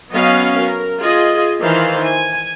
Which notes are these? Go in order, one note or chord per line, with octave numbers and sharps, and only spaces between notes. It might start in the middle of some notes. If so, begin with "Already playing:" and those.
F#3 B3 C#4 D#5 F5
A#4
F4 G#4 D#5
D#3 E3 C5 F5
G#5